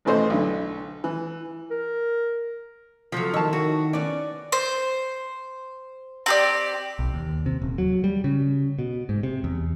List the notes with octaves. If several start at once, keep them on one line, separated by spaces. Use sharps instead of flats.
A1 B2 E3 A3 C5 D#5
B1 D3
E3
A#4
C3 F3 F#3 A4
D#3 E4 C#5 A5
F#4
B3 C#4 D5
C5
C4 G4 D5
B1
D#2
C3
D#1
F#3
G3
C#3
B2
G#2
C3
E2